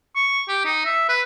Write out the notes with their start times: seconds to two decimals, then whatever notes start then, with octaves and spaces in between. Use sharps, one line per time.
0.16 C#6
0.49 G4
0.65 D#4
0.85 E5
1.09 B4